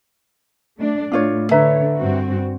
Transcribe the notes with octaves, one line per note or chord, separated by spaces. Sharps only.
A3 D4
A2 D4 F4 C#5
D3 B4 C#5 E5 A#5
G2 C4 F#4